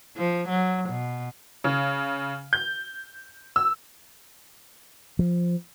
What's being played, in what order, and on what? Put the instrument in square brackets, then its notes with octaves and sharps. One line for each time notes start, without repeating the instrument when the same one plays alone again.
[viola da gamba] F3
F#3
B2
[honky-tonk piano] C#3
G6
E6
[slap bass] F3